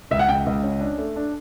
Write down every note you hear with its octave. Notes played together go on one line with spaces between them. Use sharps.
C#2 E5
F#5
C#3 G5
C#2
C#4
D4
A3
D4